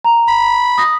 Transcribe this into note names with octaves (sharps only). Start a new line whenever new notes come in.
A#5
B5
D#6 A#6